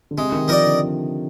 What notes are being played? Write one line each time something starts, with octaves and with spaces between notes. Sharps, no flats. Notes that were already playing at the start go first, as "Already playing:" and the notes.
D3
C3 G#3
D#3
F3 D#4 A#4 D5
D3